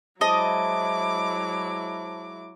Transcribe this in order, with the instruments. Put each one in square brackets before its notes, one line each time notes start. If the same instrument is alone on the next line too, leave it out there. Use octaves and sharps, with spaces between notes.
[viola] F#3 D6 [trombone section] G#3 E4 [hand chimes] C5 A5 [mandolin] D#5